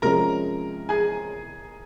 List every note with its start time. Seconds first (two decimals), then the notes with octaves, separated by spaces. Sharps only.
0.02 C3 F3 G#3 C#4 A#4 A#5
0.89 G#4 G#5